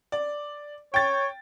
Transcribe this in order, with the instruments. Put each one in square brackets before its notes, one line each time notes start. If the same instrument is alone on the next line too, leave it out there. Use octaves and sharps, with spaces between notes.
[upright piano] D5
[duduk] C#5 [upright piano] G5 A6